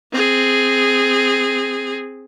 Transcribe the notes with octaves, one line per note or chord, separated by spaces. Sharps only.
C4 G#4